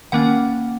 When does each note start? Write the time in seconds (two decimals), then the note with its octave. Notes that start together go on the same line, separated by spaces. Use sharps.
0.12 D#3 A#3 C#4 F#5